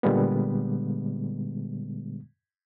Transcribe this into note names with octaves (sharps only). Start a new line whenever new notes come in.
A#2 D3 G3 G#3 B3